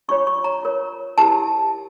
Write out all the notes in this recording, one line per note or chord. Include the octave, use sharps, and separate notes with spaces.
D4 F4 C#5 C#6
C#6
A#5
F4 A#4 C#5
E4 G4 A#4 A5